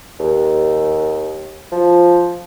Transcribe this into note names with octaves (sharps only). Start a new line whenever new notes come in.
D#2
F3